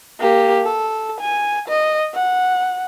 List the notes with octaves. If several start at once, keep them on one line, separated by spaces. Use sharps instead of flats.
A#3 G4
A4
G#5
D#5
F#5